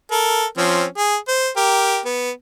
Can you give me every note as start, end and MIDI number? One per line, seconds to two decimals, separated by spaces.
0.11 0.46 69
0.11 0.46 70
0.58 0.85 53
0.58 0.85 60
0.58 0.85 61
0.97 1.16 68
1.28 1.50 72
1.57 2.00 67
1.57 2.00 70
2.05 2.31 59